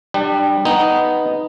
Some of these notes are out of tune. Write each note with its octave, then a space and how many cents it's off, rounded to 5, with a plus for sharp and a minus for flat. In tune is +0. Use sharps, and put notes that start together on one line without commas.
G3 +0 D4 +30
B3 +0 D#4 +0